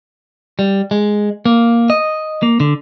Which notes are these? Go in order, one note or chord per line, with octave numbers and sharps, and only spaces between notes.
G3
G#3
A#3
D#5
A#3
D3